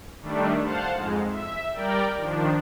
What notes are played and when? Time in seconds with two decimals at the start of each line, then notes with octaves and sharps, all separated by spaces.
0.21 D#3 G3 A3 D4
0.63 C5 F5 F#5 A5
0.94 F2 G#2 G#3
1.29 E5
1.73 G3 A#4 D5 G5
2.17 D#3 F3 D4